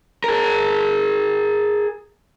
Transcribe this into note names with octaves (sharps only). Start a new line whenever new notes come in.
G#4 A#4